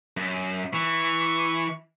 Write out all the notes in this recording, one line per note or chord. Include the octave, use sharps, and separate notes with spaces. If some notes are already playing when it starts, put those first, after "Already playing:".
F#2
E3 C#6